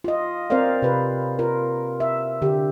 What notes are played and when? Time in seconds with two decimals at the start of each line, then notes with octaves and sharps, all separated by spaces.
0.04 F4 D#5
0.50 C4 A#4 C5 D5 F5
0.82 C3 F4 B4
1.39 F4 A#4
2.00 E5
2.42 D3 G4